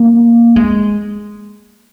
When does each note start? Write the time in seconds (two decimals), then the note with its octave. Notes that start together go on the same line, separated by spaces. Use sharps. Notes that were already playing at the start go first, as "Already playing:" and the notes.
Already playing: A#3
0.56 G#3